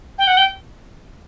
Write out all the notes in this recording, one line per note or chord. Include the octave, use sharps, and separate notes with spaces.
G5
F#5
G5